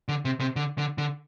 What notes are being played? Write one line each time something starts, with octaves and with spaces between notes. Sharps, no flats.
D3
C3
C3
D3
D3
D3